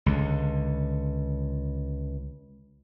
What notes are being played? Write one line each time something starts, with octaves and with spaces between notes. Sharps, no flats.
C#2 D3